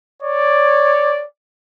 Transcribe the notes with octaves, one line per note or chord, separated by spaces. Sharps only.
C#5 D5